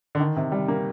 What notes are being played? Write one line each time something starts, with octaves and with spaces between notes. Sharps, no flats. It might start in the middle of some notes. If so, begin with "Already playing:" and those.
D3
D#3
C3
G3
A#3